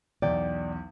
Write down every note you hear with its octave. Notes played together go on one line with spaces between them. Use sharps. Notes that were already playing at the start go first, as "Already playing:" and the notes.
B1 E2 D5 G5